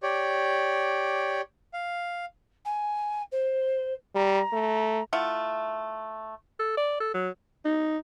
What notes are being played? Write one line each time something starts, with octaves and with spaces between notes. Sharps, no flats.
G4 C#5 D5
F5
G#5
C5
G3 A#5
A3
A3 E4 F4 F#5
A4
D5
A4
F#3
D#4